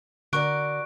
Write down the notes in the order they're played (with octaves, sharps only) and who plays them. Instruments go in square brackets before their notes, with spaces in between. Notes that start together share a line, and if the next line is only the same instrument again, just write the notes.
[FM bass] D3 [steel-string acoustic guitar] F#4 A#4 D5 [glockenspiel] C#6 F#6 D7